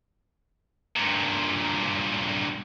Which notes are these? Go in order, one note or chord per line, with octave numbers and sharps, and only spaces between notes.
G2 A#2